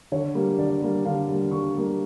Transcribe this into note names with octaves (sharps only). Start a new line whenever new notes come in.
D3 C#5
G3 A#3
D3 D5
G3 A#3
D3 F5
G3 A#3
D3 C#6
G3 A#3